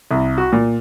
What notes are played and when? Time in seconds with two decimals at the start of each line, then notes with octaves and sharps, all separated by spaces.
0.11 C2
0.38 F#4
0.52 A#2